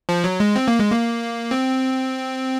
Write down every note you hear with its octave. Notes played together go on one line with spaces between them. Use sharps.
F3
F#3
G#3
C4
A#3
G#3
A#3
C4